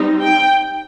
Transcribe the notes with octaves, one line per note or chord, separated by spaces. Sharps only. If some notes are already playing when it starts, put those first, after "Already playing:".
Already playing: G3 C4 D#4
G5